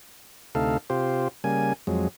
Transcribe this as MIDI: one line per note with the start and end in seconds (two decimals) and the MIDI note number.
0.55 0.77 38
0.55 0.77 48
0.55 0.77 57
0.55 0.77 63
0.55 0.77 69
0.55 0.77 77
0.90 1.28 48
0.90 1.28 65
0.90 1.28 67
0.90 1.28 72
1.44 1.73 49
1.44 1.73 55
1.44 1.73 58
1.44 1.73 80
1.87 2.08 41
1.87 2.08 54
1.87 2.08 56